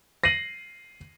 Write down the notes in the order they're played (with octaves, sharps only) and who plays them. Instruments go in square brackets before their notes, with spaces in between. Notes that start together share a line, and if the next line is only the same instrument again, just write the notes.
[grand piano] A#6 C7 D#7 F#7